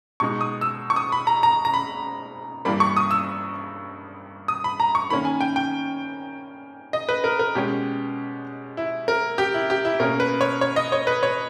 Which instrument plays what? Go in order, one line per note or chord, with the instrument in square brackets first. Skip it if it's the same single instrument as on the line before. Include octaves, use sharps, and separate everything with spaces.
[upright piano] B2 G#3 D#4 C#6
D#6
E6
C#6
D#6
B5
A#5
A#5
A#5
B5
G2 E3 G3 A#3 B5
C#6
D#6
E6
D#6
B5
A#5
C#6
D#3 A#3 C#4 B5
G#5
G5
G5
D#5
B4
A#4
A#4
B2 G#3 C#4 G4
E4
A#4
G4
E4
G4
E4
B2 A#3 C#4 A#4
B4
C#5
C#5
D#5
C#5
B4
C#5